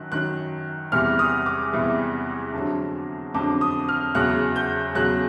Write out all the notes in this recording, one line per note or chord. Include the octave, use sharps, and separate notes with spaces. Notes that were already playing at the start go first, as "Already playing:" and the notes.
Already playing: F#2 D#3 F#3 F#6
F#2 D#3 F#3 F#6
E2 C3 E3 G3 F6
D#6
D6
E2 C3 E3 G3
F2 D3 F#3
F2 D3 F#3 D6
D#6
F6
E2 C#3 F#3 F#6
G6
E2 C#3 F#3 F#6